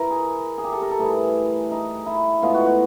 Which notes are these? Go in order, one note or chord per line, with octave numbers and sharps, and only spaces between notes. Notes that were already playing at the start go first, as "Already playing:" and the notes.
Already playing: E3 E4 A#4
G#4
G#4
G4
A4
A#4
A4
A2 E3 G3 G#4
D#4
E4
A2 E3 G#3 B3 F4
F#4
F#4